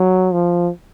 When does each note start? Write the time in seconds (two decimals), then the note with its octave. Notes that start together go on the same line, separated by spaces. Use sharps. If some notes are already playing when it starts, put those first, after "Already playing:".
Already playing: F#3
0.33 F3